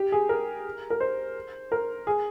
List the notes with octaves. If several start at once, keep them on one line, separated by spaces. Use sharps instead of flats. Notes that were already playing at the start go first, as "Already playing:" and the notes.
Already playing: G4
G#4
A#4
A#4
C5
A#4
G#4